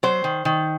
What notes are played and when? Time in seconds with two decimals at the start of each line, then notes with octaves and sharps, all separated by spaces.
0.03 F#3 C5
0.24 D#3
0.45 D#3